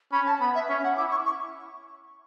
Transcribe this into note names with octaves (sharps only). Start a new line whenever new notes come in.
C#4 B5
A5
B3 B5
E5
C#4 E5
F#5
E4 D6
C#6
C#6